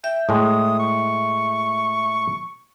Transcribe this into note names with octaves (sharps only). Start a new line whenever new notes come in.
E5 G5
A2 G#3 D#6
C#6